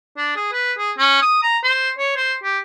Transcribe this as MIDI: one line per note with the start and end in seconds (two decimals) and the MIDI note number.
0.17 0.34 62
0.36 0.50 68
0.52 0.72 71
0.78 0.92 68
0.98 1.21 61
1.22 1.40 87
1.43 1.58 82
1.64 1.90 72
1.98 2.14 73
2.16 2.34 72
2.44 2.59 67